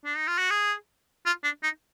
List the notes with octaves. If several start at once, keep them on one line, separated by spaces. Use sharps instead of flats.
D4
D#4
F4
F#4
G#4
F4
D4
D#4